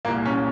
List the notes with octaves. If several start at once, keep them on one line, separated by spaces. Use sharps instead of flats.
C2 A#2 A#3
C#4